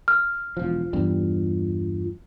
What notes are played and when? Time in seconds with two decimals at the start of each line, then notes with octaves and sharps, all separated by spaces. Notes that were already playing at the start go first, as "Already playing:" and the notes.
0.08 F6
0.57 E1 F3 F4
0.93 E2 G2 G3